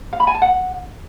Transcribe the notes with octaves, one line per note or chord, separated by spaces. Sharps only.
F5
B5
G#5
A5
F#5